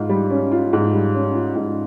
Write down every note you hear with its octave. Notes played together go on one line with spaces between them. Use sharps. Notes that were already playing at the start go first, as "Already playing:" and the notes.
Already playing: G#2 F4
G3
C#4
F4
G#2
G3
C#4
F4
G#2